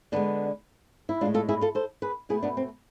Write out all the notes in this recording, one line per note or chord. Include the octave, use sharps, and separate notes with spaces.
D3 G#3 B3 D4
E4
A2 G#3 D4 F4
F4 A4
E4 G#4
F4 A4
A4 C5
G#4 B4
B2 A3 E4 G#4
B3 D4
C4